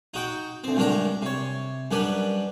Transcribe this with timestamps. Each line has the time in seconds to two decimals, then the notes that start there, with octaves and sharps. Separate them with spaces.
0.14 D#4 F#4 G5
0.64 D2 C4
0.76 C#2 G2 F#3 D4 A#4 A#5
1.22 C3 C#5
1.91 F#2 G3 D4 A#4 B4